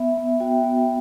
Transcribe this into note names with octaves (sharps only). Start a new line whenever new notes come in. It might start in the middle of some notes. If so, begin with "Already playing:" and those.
Already playing: B3 E5
B3
F#4 G5
B3